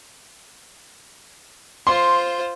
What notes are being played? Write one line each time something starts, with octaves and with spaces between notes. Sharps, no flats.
F4 C5 C6